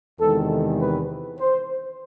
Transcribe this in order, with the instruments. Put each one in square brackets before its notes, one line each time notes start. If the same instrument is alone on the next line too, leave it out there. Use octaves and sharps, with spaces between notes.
[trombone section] E2 C3 D#3 G#3 A4
B4
C5